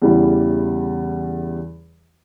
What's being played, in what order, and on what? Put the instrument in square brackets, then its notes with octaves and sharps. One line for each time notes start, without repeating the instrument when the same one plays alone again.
[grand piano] E2 C#3 E3 G3 E4